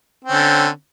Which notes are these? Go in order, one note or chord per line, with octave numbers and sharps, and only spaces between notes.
D3 C4 C#4